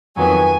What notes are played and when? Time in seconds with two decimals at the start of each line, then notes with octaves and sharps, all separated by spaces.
0.17 F2 D#3 F#3 B3 G#5